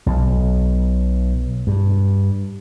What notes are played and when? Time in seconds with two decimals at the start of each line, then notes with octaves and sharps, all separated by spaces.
0.06 B1
1.67 G2